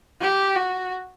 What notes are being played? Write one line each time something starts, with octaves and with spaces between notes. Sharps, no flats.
G4
F#4